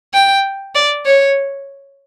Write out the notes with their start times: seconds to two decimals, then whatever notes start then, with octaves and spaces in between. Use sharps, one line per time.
0.14 G5
0.75 D5
1.06 C#5